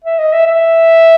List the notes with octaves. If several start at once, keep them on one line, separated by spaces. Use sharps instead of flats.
E5
D#5
E5
E5